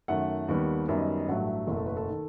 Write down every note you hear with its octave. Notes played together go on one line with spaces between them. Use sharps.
F#2 D#3 A3 F#5
D#2 D#3 G3 B3
F#2 D#3 G3 B3 E5
D#5
D#5
A1 G2 F#3 A3 F#5
E5
F#1 E2 B2 A3
A4
B4
A4
D#3